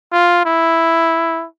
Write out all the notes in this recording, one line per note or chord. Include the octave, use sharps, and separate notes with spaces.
F4
E4